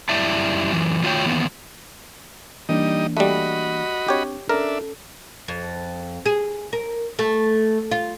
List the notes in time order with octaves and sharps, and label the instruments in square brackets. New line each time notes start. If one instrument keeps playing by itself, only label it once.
[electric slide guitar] F#2 G3 E4 D5 E5 A5
F#2 E3
D#3 A3 F4 F#4 C#5 G5
D#3 E3 A#3 B3
[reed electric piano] E3 A#3 D4 [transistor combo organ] G3 D#4 D#5
[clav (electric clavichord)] G3 A3 [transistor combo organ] F#4 D#5 B5
[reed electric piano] C4 D4 [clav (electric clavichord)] G4 C#5
[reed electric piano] C#4 A4 [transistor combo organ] D4 E5 [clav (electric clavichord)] A#4
[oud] F2
G#4
A#4
A3
F4